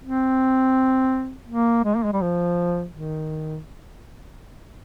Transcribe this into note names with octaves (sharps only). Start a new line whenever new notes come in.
C4
A#3
G#3
A#3
G#3
G3
F3
D#3